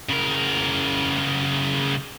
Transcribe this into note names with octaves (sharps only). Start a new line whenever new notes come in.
C#3 A#4